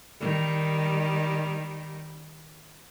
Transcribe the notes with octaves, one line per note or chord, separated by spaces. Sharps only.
D#3 G3